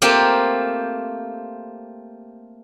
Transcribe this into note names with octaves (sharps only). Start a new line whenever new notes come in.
A3 A#3 C4 F4 G4